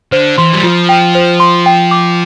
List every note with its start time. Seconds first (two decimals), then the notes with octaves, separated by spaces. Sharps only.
0.12 D3 C5
0.38 E3 C6
0.53 G3
0.63 F3 F4
0.89 G5
1.15 C5
1.40 C6
1.66 G5
1.91 D6